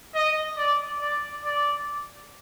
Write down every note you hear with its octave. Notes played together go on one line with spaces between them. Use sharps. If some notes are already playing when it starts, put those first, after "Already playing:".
D#5
D5
D5
D5